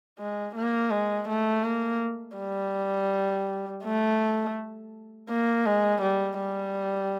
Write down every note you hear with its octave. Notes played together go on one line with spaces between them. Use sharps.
G#3
A#3
G#3
A3
A#3
G3
A3
A#3
G#3
G3
G3